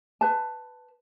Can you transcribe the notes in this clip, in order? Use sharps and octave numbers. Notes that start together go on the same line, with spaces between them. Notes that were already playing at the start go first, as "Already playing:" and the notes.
B4 A5